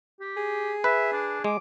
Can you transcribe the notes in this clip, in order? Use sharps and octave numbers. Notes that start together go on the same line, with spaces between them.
G4
G#4
B4 E5
D4
G#3 D6